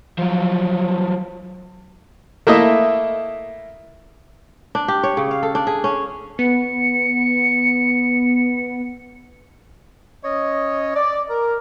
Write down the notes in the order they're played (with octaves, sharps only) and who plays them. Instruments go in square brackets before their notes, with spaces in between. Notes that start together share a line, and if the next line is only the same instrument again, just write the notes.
[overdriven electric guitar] F3 F#3
[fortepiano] A3 A#3 E4 D#5
[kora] D4
G4
C#5
C#3
F5
A4
D4
G#4
C#4
[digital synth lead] B3 [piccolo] C#7
[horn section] C#4 C#5 D#5
D5
A#4